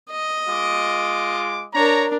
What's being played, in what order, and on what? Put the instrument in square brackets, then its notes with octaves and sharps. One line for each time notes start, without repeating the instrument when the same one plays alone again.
[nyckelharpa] D#5
[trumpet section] G#3 F4 D6
[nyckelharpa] D4 A#4 [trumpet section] C#5 A#5